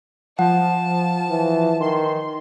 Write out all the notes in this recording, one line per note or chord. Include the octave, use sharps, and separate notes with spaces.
F3 F#5 A5
E3
D#3 C6